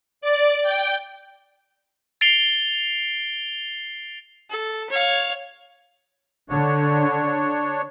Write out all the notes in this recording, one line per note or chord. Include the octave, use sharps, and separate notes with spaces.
D5
G5
A6 C7 D7 F7 G7
A4
C#5 F5
D3 D4 C#5